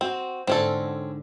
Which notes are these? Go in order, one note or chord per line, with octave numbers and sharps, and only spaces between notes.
C4 F#4
G#2 D3 C4 C#4 A4